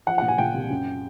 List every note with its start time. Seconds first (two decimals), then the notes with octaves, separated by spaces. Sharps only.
0.06 F3 F#5
0.18 A#2 F#5
0.28 G#5
0.38 A#2 G5
0.54 C2
0.70 F#2